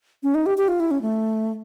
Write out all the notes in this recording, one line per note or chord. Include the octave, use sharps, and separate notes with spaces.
C#4
D#4
G4
G4
F4
E4
C#4
A3